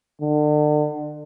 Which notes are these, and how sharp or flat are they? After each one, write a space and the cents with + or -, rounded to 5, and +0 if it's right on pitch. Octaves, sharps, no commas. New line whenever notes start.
D3 +35